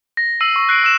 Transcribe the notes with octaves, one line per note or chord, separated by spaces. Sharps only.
A#6
E6 C7 D#7 F#7
C#6
F#6 C7 D7
E6 E7